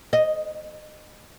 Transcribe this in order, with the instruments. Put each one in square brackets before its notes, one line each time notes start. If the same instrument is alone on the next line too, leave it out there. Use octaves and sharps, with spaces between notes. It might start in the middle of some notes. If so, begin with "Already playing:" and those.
[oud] D#5